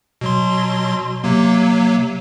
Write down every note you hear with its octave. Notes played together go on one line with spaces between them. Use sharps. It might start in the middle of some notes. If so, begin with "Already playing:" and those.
B2 F#3 C6
C3 F#3 A#3